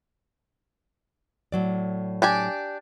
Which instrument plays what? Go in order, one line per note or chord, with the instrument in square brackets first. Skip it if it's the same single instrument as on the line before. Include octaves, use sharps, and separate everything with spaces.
[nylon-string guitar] A2 F#3 D5
[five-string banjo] D4 G4 G#5